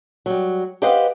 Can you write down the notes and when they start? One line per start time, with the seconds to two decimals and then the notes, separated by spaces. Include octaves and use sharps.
0.26 F#3 G3
0.82 G4 B4 C5 D#5 F5 F#5